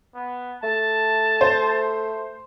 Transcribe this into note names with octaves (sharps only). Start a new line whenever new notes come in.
B3
A3 A5
C5